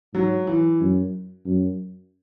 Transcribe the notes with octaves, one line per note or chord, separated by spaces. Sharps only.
G#2 F#3
E3
F#2
F#2